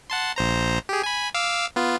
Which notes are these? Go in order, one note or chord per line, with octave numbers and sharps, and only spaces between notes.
F#5 A5 C6
A#1 C5 A#5
G4 G#4
G#5 B5
F5 D6 E6
B3 F4